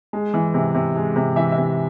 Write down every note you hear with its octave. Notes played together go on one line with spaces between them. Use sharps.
G#3
E3
C3
C3
G#3
C3
E3 E5
E5
C3